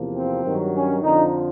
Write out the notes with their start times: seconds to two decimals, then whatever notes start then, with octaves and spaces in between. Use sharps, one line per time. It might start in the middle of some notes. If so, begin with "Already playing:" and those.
Already playing: E2 C3 F3 A#3
0.15 C4
0.43 G2 D#3 F#3
0.73 C#4
1.02 F2 D3 F3 D#4